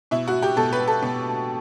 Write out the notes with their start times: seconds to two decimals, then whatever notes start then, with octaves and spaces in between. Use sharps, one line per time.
0.11 B2 E4
0.28 F#4
0.43 G4
0.57 B2 A4
0.73 B4
0.87 A4
1.02 B2